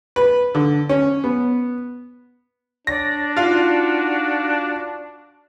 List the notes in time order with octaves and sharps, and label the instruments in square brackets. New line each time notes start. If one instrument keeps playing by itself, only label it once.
[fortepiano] B4
D3
C#4
B3
[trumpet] D4 [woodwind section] C#5 D5 [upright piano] A#6
[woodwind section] D#4 F#4 [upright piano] F4 F5